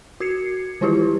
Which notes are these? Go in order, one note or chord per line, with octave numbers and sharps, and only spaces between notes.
F#4 G#6 C7 C#7
D#3 E3 E4 F4 G4 B4